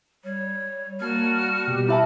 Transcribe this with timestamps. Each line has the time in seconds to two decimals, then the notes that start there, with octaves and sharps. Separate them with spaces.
0.24 G3 C#5
1.00 G3 A#3 F#4 A5 F6
1.66 B2 G4
1.88 E4 E5 F#5 A5 B5